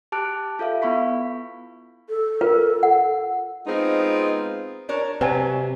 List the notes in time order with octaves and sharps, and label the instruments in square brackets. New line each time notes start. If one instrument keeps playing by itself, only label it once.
[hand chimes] G4 A5 D6 F6 F#6 D7
F4 A4 E5 F5
B3 E4 B5 C#6 B6
[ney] A4
[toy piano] F4 A#4 B4
F#5
[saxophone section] G#3 B3 C4 D#4 F4
[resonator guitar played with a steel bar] D4 A#4 C#5
[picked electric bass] C3 [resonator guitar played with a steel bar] F#3 G3 [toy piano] B4 G#5 A5